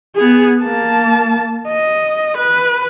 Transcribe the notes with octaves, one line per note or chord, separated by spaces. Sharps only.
B3 G#4
A#3 A5
D#5
B4